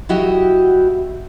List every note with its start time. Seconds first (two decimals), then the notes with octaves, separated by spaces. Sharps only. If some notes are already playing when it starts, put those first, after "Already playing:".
0.09 F#3 E4 F#4 G4 D#5